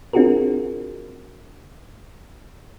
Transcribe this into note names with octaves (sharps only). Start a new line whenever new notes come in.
C4 D4 F4 F#4 G#4 A#4